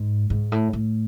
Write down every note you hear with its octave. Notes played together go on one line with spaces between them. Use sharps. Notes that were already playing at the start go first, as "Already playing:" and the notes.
Already playing: G#2
G#2
A2
A2